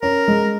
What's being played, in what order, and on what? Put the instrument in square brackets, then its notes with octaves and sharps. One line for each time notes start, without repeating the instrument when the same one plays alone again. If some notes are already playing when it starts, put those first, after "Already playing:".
[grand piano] C#4 [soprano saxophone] A#4
[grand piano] G#3